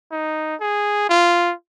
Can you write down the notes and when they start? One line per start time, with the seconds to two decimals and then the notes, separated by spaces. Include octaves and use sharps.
0.12 D#4
0.61 G#4
1.09 F4